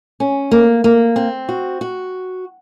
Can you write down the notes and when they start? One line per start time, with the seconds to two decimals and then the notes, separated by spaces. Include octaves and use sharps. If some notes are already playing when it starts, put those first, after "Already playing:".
0.20 C#4
0.51 A#3
0.84 A#3
1.16 C4
1.49 F#4
1.81 F#4